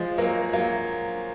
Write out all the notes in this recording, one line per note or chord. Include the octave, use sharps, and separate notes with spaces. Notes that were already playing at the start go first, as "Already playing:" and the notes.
Already playing: F3 G#3
F#3 A#3
F#3 A#3